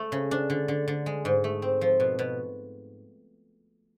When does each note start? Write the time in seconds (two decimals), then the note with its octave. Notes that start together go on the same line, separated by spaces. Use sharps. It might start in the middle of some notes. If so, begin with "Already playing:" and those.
Already playing: A3
0.12 C#3
0.31 D4
0.50 D3
0.68 D3
0.88 D3
1.06 G#3
1.25 G#2
1.44 A3
1.62 C4
1.81 F3
2.00 B2
2.19 B2